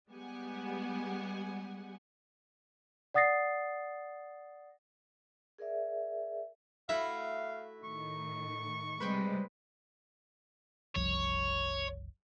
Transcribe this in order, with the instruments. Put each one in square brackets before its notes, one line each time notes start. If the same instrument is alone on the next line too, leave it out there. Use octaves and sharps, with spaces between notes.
[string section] G3 G#3 B3 G4 F#5 G#5
[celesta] D5 F#5 D#6 A6 A#6 C7
[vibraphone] G#4 A#4 D5 E5
[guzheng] A3 E4 F#4 [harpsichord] E5 [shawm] F5
[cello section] A2 D#3 [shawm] C#6
[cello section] C3 G3 G#3 [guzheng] B4 C5 G5
[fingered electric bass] F#1 C2 F3 [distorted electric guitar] C#5